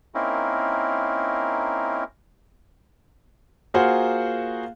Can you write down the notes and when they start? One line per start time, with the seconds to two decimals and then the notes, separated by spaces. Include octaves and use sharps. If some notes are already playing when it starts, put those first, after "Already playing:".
0.15 A#3 C4 C#4 D#4 E4 A#4
3.74 A#3 F4 F#4 G#4 C5 F#5